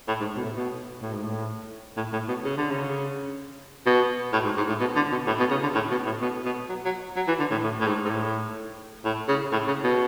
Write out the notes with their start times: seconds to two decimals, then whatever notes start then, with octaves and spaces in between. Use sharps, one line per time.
0.08 A2
0.20 G#2
0.37 B2
0.44 A2
0.56 B2
1.02 A2
1.13 G#2
1.23 A2
1.97 A2
2.13 A2
2.28 B2
2.44 C#3
2.57 D3
2.71 C#3
3.86 B2
4.33 A2
4.45 G#2
4.57 G#2
4.68 A2
4.80 B2
4.96 D3
5.12 B2
5.27 A2
5.39 B2
5.51 C#3
5.63 D3
5.75 A2
5.91 B2
6.06 A2
6.21 B2
6.45 B2
6.69 F#3
6.85 F#3
7.16 F#3
7.28 E3
7.40 D3
7.51 A2
7.63 A2
7.80 A2
7.87 G#2
8.05 G#2
8.10 A2
9.05 A2
9.28 C#3
9.52 A2
9.68 C#3
9.84 B2